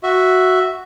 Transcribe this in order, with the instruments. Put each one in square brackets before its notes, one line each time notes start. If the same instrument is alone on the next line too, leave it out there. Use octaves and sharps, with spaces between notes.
[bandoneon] F#4 E5